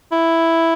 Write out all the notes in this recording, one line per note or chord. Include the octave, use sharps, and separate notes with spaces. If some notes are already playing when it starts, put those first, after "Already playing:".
E4